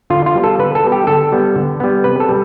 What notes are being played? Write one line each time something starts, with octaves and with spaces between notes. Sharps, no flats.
D3 F4
F4
G3 B3
A4
D3 B4
A4
G3 B3
G4
D3 A4
G3 B3
D3
G3 B3
C3 B4
A4
G3